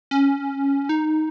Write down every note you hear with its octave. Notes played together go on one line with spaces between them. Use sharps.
C#4
D#4